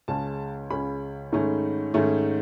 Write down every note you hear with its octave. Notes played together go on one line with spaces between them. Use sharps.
C#2 C#3 G#3 C#4 A5
C#2 C#3 G#3 C#4 B5
G#2 D#3 A3 C#4
G#2 D#3 A3 C#4